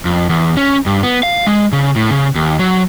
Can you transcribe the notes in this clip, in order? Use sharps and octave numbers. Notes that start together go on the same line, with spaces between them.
F2
E2
C#4
G2
B3
F5
G#3
C#3
A2
C#3
D#2
F#3